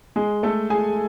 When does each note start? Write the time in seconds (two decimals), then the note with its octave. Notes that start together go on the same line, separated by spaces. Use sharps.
0.16 G#3 G#4
0.43 A3 A4
0.70 G#4 G#5